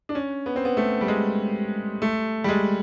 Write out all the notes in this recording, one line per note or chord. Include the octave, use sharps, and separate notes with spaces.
D4
C#4
B3
C4
B3
A3
G3
G#3
A3
G3
G#3